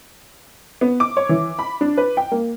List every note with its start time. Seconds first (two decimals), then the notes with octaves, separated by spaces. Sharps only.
0.81 B3
1.00 D6
1.17 C#5
1.29 E3
1.59 B5
1.81 D4
1.97 B4
2.17 G5
2.32 A#3